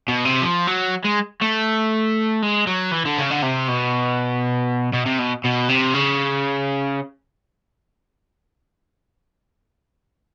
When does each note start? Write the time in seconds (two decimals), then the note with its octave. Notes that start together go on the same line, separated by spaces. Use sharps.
0.08 B2
0.25 C3
0.42 F3
0.67 F#3
1.04 G#3
1.41 A3
2.42 G#3
2.67 F#3
2.92 E3
3.06 D3
3.18 C#3
3.30 D3
3.43 C3
3.68 B2
4.93 B2
5.06 C3
5.19 B2
5.44 B2
5.69 C3
5.94 C#3